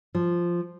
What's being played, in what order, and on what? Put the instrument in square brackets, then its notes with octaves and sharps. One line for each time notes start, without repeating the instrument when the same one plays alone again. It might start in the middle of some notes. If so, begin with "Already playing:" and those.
[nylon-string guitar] F3